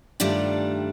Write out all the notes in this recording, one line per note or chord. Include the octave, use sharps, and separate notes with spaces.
G2 D#3 G3 A3 D4 F4